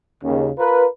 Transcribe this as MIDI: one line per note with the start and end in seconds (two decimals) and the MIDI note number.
0.24 0.49 39
0.24 0.49 49
0.58 0.86 65
0.58 0.86 70
0.58 0.86 71